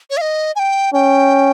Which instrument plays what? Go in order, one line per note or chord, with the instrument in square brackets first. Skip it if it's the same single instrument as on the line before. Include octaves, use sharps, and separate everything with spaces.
[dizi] C#5
F5
D#5
G#5
G5
[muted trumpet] C#4 [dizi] G5